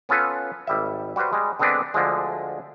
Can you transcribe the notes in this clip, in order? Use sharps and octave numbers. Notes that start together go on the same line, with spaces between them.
B3 C#4 F4 A4 B4
G#1 G3 E5
G3 F#4 G4 B4 C5
G3 G#3
D3 G#3 B3 C4 D4 B4
D2 D3 F3 G#3